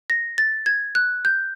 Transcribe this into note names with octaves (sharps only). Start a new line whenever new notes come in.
A#6
A6
G#6
F#6
G6